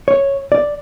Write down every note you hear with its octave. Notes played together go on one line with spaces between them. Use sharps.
C#5
D5